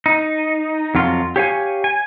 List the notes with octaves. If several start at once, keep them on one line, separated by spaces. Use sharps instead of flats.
D#4
F2 F#3 F4
G4 C#5 F5 G#5
G#5